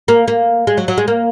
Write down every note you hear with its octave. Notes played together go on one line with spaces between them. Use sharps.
A#3
A#3
G#3
F#3
F#3
G#3
A#3